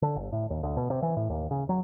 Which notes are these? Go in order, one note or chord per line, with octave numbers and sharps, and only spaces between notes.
D3
G1
A2
D#2
D2
B2
C3
E3
A2
D#2
C#3
F#3